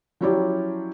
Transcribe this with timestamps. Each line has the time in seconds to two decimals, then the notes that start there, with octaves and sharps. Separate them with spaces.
0.21 F3 F#3 C#4 E4 G4 D5